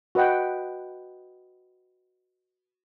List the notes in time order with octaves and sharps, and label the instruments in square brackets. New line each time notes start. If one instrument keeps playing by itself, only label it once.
[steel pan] F#4 B4 D#5 F#5 G5